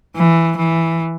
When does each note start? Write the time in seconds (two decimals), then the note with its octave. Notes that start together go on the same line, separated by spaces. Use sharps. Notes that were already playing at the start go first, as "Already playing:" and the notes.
0.15 E3
0.57 E3